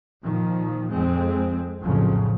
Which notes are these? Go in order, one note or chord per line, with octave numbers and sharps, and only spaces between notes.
A#2 D#3 F3
F2 G#3 C4
A#1 F2 A2 C#3 F3 F#3